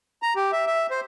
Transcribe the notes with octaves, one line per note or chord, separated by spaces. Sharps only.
A#5
G4
E5
E5
C5